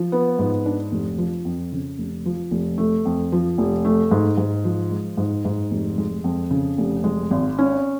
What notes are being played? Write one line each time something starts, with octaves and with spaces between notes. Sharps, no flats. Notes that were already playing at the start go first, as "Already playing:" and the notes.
Already playing: F3
B3
G#2
D4
F1
F3
F2
C#3
F1
F3
F1
A3
F2
F3
F1
A3
G#2
G#2
F3
G#3
G#2
G#2
F1
G#3
F2
C#3
F1
G#3
G#1
C#4